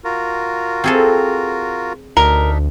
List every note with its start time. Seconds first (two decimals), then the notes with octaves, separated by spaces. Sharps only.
0.04 F4 F#4 A#4
0.84 C4 G#4 A4
2.17 D2 D4 D#4 A#4 E5